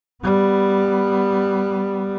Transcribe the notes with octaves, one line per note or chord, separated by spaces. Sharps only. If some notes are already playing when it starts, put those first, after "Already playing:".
G3 B3